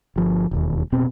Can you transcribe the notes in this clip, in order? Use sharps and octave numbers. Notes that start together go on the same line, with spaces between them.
G1 F3
E1 D#2
F1 B2 C4